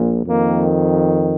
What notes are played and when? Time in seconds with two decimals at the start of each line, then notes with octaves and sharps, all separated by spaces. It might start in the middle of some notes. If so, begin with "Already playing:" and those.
Already playing: A#1 A#2
0.25 F2 D#3 A#3